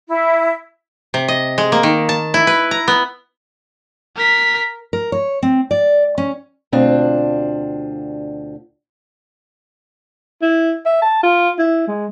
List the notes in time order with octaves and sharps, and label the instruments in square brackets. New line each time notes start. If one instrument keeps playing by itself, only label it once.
[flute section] E4
[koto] C3
D#5
G#3
A#3
D#3
A5
E4
B4
A#5
B3
[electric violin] A#4 B6
[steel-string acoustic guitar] A#4
C#5
C4
D5
C#4
D2 B2 C4 D4 F4
[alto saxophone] E4
E5
A5
F4
E4
G#3